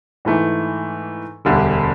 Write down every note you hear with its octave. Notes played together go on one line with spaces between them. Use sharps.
G#2 E3 A3
E1 D2 D3 G3